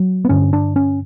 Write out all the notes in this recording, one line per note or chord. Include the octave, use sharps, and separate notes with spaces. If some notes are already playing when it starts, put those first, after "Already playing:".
Already playing: F#3
B3
G2 D3 C#4
D4
C#4